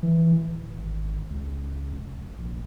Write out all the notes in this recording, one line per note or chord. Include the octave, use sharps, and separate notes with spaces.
E3
D1
G#1
C#2
F1
A#1